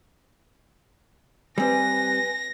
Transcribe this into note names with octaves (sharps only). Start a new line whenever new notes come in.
G3 C4 B4 G#5 A#6